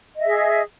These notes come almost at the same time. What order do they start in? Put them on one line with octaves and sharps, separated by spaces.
D#5 E5 G#4